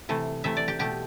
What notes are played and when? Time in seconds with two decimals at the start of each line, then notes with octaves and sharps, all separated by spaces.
0.09 C3 E3 A3
0.44 C3 E3 A3 E5
0.57 D5
0.68 G4
0.79 B2 A3 G4